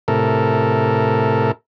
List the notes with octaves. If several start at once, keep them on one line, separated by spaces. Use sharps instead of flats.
A2 C3 A4 A#4